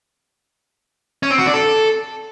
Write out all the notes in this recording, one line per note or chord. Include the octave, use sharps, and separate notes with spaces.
C#4
C4
F#4
D4
A4